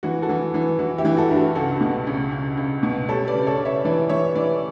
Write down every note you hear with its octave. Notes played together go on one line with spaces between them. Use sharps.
E3 F#4
F#4 A4
E3
E3
E3 F#4
E4 G4
E3
F#4 A4
G2 B4
F#4 A4
C#2 F#4 A4
B2
C#2
C#2
C#2
B2
G3 A4 C#5
B4 D5
C#3
A4 C#5
C#3
C#5 E5
E3 B4 D5
E3 C#5 E5
E3 B4 D5